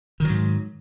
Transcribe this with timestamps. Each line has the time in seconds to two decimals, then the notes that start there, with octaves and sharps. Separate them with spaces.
0.20 D#3
0.25 F#3
0.30 G#2